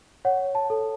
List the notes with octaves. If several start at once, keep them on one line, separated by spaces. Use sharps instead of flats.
C#5 F#5
A5
A4